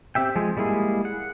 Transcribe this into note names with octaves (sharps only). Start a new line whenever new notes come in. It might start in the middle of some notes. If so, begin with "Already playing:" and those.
C4 G4 E5 G5
F3 G#3 G#4
G3 G#3 A#3 E4 G#4
F#5